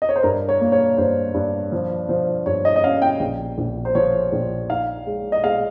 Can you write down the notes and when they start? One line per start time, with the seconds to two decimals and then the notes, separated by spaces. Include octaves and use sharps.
0.02 D#5
0.09 C#5
0.16 C5
0.23 G2 A#4
0.49 C#5
0.61 A#3
0.72 C#5
0.97 G2 C5
1.34 G2
1.72 F3
2.09 F3
2.46 G2 C#5
2.65 D#5
2.76 D#5
2.84 C#4 F5
3.02 G5
3.20 A#1
3.58 A#1
3.85 C5
3.95 F3 C#5
4.32 A#1
4.69 D#4 F5
5.07 G#3
5.32 D#5
5.44 G#3 F5